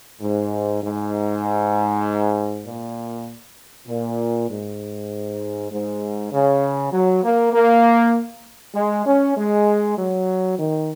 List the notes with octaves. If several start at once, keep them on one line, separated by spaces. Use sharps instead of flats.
G#2
G#2
A#2
A#2
G#2
G#2
C#3
F#3
A#3
A#3
G#3
C#4
G#3
F#3
D#3